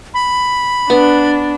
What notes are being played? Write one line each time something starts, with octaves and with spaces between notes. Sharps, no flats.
B5
B3 D4